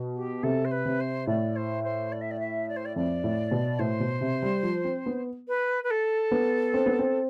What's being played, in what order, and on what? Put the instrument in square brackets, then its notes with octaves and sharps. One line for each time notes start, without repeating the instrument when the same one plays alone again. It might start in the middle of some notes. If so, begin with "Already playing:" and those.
Already playing: [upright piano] B2
[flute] G4
[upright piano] C3 [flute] A4
[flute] C5
B4
[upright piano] C3
[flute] C5
[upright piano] A2 [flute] D5
[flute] C5
C5
D5
E5
D5
E5
D5
C5
D5
[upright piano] F2 [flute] D5
[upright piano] A2
B2
[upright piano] A2 [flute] C5
[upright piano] B2
C3
G3
F3
C4
B3
[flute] B4
B4
A4
[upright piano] B3
C4
B3
C4